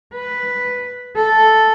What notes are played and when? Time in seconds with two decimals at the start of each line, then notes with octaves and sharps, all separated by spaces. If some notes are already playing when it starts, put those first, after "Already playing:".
0.14 B4
1.16 A4